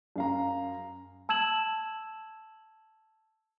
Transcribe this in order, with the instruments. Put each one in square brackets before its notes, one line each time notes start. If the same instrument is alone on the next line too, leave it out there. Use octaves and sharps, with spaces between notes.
[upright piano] F#2 F5 A#5
[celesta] A5 E6 G#6 E7 F#7